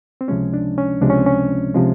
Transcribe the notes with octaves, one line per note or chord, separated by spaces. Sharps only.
C4
C#2 C3 F3 G#3 C#4
D4
C#4
C#2 C3 F3 G#3 D4
C#4
C4
C#4
C3 F3 G#3